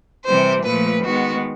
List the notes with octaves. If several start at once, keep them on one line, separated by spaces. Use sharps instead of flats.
C3 E3 G3 C5
A#2 F3 A3 B4
D#3 G#3 B3 F#4